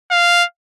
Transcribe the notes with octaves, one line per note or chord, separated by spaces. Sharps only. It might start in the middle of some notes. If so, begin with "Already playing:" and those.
F5